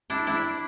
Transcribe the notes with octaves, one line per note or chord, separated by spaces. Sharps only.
D4 E4
D4 E4